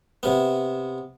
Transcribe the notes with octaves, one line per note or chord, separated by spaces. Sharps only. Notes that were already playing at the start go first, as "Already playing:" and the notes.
C3 B3